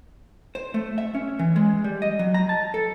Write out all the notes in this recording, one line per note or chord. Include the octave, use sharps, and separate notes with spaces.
C5
A3
E5
C#4
E3
G#3
G3
D#5
F#3
A#5
A5
A4